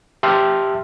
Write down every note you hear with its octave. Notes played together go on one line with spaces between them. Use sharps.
G4 E5 A5 C6 F6